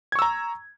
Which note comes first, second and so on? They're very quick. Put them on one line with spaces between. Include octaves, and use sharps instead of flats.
G#6 C#6 E6 A#5